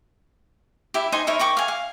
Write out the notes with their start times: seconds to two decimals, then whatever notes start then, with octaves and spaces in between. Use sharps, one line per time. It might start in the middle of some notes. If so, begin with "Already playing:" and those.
0.94 E4 G4
1.12 D#4 C5 G#5 C6
1.27 D#4 E4 A#4 C#5
1.39 A#4 G5 C#6 D6
1.57 F5 G#5
1.68 F5